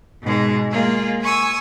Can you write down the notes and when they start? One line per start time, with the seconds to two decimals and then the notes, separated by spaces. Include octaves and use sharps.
0.21 G#2 B2 G#3
0.71 G#3 A#3 F4 G#4
1.21 G#5 C#6 D#6 E6